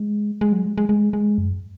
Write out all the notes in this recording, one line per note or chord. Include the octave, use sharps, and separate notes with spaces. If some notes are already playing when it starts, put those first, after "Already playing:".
Already playing: G#3
G#3
F#3
G#3
G#3
G#3
G#3
F#2